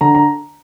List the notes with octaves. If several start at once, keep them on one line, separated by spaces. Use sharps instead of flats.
D3 A#5
A#5